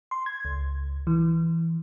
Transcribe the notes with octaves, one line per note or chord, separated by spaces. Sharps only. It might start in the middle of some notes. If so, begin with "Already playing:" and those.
C6
G#6
C#2
E3